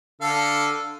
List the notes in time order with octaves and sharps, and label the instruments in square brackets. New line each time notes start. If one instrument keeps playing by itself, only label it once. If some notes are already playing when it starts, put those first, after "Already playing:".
[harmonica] D3 A4 F5